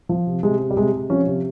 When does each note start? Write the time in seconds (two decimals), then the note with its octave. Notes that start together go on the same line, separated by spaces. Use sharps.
0.09 F3
0.27 C3
0.43 C3 G#3
0.60 C3
0.71 G3
0.77 C3 G#3
0.93 C3
1.10 F3 C#4
1.27 C3